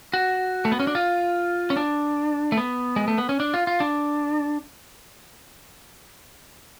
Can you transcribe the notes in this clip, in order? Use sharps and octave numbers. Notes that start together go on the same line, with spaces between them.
F#4
A3
B3
C#4
D4
F4
C#4
D4
A3
B3
G#3
A3
B3
C#4
D4
F4
F4
D4